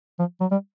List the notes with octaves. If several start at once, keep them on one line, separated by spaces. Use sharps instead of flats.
F3
F#3
G3